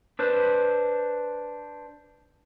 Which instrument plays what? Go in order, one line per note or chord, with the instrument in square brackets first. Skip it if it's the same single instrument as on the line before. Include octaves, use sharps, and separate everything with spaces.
[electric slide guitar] D4 B4 C5